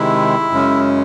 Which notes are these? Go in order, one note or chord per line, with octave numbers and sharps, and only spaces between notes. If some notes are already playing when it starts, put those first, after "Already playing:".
Already playing: C3 D#3 G#3 E4
F#2 C#3 G#3 C#4